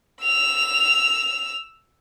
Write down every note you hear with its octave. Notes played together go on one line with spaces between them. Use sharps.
E6 F7